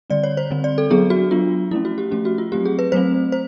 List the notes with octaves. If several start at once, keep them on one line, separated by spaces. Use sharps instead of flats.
D3 G3 C4 D5
C#5
C5
D3 G3 C4
D5
A4
F#3 B3 D4 G#4
F#4
F#3 B3 D4 F4
F3 A3 C#4 E4
F#4
G4
F3 A3 C#4 G4
F#4
F4
F#3 A3 C4 G4
G#4
B4
F#3 A3 C4 C5
C5